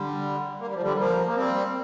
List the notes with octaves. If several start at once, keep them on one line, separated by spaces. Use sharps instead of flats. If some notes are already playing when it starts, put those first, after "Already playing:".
Already playing: D3 G3
A#3
G3
F3
D3 G3
F3 A#3
A#3
G3 C4